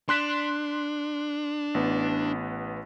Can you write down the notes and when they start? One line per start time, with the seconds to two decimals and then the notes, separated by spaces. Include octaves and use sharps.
0.09 D4 C6 F#6 B6
1.74 A1 B3